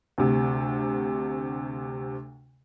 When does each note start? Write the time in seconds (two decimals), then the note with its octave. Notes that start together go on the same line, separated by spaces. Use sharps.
0.18 D2 C3